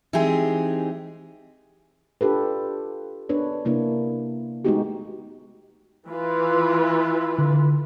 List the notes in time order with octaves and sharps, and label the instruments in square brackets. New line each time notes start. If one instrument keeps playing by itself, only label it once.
[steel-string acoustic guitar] E3 G#3 C4 D#4 G4 G#4
[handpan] D4 F4 G4 A4 B4
B3 D4 B4 C#5
C3 A#3 D4 E4
G#3 A3 B3 D#4 F#4 G4
[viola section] E3 F4 B4
[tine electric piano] D3